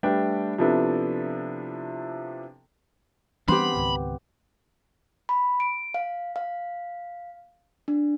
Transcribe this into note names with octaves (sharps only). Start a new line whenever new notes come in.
G3 A3 D4 B4 G5
C3 F3 B3 D4 E4 A4
E3 G3 B3 C4 D4 G4 B5 C6
C#2 G#2 D#3
B5
D7
F5
F5
D4